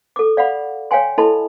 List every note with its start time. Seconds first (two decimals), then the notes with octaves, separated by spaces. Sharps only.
0.16 A4 D6
0.37 D5 F5 F#5 B5
0.91 C#5 F5 G5 G#5 C6
1.18 E4 A4 D#5 A5 B5 C6